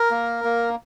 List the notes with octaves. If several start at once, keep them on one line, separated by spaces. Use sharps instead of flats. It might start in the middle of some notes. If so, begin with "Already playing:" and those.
Already playing: A#4
A#3
A#3